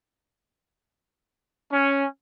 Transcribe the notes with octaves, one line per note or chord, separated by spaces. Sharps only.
C#4